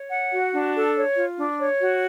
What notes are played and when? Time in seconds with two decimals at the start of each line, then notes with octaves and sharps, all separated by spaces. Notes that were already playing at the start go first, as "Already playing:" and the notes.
Already playing: C#5
0.11 F#5
0.32 F#4
0.53 D4
0.74 A4
0.96 C#5
1.16 F4
1.38 D4
1.59 C#5
1.80 F#4